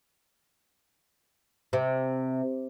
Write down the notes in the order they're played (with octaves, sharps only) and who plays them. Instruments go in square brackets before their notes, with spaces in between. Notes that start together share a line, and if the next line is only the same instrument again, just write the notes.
[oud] C3